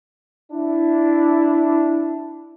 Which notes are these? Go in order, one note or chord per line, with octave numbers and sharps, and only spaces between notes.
D4 E4